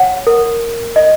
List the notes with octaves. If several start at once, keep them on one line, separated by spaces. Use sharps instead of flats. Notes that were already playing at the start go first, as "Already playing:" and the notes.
Already playing: C#5 F#5
A#4
D#5